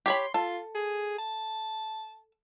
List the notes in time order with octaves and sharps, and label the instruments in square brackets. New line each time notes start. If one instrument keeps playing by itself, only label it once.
[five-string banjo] G4 C#5 B5 [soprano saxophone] C6
[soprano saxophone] F4 [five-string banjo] A4
[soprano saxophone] G#4
A5